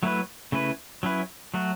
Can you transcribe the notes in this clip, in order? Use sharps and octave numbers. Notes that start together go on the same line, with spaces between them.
F#3 A3 E4 B4
C#3 A3 E4 B4
F#3 C#4 E4 B4
F#3 A3 F#4